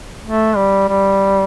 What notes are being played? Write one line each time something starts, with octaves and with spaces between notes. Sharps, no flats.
A3
G3
G3